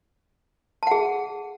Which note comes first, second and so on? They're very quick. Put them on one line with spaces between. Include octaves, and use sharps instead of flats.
A5 F#5 G#4